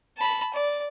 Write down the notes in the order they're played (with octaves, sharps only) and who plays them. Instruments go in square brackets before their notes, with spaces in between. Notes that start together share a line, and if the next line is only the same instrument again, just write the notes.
[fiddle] A5 B5
D5